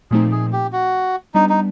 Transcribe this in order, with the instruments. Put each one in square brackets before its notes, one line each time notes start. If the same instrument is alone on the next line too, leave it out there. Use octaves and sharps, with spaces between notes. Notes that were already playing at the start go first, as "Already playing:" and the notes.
[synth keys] A#2 F3 A3 C4 D#4 [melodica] G#4
[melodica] G#4
G4
F#4
[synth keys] G3 B3 D4 [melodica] D#4
[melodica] D#4